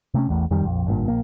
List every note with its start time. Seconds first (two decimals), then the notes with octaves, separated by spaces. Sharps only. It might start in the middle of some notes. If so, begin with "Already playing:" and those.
0.14 C3 A3 C4 C#4
0.29 A1 E2 A2
0.51 F2 D#3 G3
0.64 A#1 F2
0.87 G#1 G2 A#2
1.08 A#1 A#3